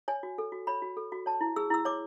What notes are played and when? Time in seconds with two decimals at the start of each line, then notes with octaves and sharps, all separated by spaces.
0.08 C#5 G#5
0.23 F#4
0.38 A4
0.52 F#4
0.67 C#5 B5
0.82 F#4
0.97 A4
1.12 F#4
1.26 C#5 A5
1.41 E4
1.56 G#4 E6
1.70 E4 E6
1.85 C#5 D6